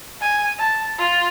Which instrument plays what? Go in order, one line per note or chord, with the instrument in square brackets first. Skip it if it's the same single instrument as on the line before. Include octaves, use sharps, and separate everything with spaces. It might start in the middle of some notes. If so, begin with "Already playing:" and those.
[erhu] G#5
A5
F4